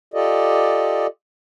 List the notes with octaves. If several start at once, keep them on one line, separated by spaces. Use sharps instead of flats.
F4 G4 A4 D5 D#5